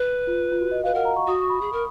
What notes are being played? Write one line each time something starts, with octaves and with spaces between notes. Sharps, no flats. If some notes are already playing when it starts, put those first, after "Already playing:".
Already playing: B4
F4
F4
F#4
D#5
B4 F5
A#4 F#5
A#5
C#6
F#4 D#6
C#6
B5
G#4
A#4